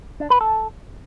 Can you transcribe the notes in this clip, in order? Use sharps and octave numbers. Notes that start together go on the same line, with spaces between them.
D4
B4
A4